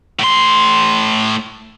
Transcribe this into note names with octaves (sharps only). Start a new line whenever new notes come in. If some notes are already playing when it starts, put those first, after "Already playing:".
A2 C6